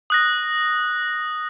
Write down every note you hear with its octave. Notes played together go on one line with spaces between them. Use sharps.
D#6 F#6 A#6